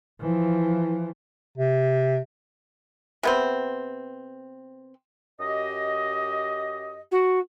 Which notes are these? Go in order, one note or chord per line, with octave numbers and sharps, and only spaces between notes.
E3 F3
C3
C3 B3 C4
F#2 G4 D#5
F#4